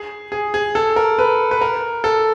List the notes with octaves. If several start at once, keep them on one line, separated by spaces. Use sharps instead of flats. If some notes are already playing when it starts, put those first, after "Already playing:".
Already playing: G#4
G#4
G#4
A4
A#4
B4
B4
A#4
A4